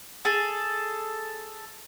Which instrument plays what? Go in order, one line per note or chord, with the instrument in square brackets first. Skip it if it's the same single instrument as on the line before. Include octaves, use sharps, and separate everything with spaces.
[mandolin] G#4 A4